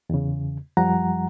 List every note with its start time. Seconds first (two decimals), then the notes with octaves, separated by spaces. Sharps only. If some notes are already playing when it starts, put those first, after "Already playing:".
0.10 E2 C#3
0.77 F#2 F3 G3 F#5 A#5